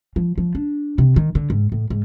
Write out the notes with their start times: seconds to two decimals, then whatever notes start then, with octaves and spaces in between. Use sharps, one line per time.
0.16 F3
0.38 F3
0.55 D4
0.98 C3
1.16 D#3
1.35 D3
1.50 G#2
1.72 A2
1.90 G#2